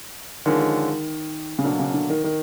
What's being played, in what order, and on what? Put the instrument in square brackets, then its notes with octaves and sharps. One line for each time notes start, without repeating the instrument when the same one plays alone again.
[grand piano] D3 F3 G#3 C#4 [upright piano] D#3
[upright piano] C#3
[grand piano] B2 F#3 A#3 D4 [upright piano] D3
[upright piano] C#3
D3
D#3
D#3